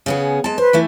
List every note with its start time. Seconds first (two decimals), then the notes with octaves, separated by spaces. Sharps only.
0.06 C#3 B3 G#4
0.44 G#3 A5
0.58 B4 C5
0.73 E3 A3 E4